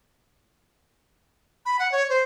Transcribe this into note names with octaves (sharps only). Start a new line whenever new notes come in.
B5
F#5
C#5
C5